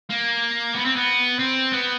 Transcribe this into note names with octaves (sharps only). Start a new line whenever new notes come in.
A#3
B3
C4
B3
C4
B3